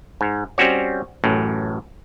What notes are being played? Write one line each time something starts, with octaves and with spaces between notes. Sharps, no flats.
G#2
G3 C4 C#4 F#4 C#5
A1 F#2 A2